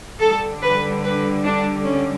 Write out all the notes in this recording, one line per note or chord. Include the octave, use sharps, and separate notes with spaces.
D3 G3 A4
B4
B4
D4
C#4